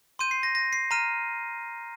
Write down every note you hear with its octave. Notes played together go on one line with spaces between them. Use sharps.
C6 G6 D#7
C7
A#6
A#6
C7
A#5 F6 D#7